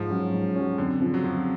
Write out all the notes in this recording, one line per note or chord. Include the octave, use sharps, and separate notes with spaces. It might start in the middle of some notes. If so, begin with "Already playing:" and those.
Already playing: G#2 F3
F#3 C#4
G#2
F#3 C#4
F2 D3
C#3 F3
F#3
F2 F3